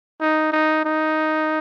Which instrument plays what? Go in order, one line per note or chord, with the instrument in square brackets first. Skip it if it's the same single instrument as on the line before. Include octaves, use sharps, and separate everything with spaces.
[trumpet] D#4
D#4
D#4